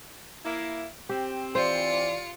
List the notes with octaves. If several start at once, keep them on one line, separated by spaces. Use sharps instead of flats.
A#3 E4
C4 G4
E3 F4 C5 D5 C#7